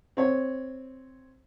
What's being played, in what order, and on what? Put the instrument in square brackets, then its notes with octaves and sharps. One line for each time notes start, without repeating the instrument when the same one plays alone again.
[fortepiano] C4 C#5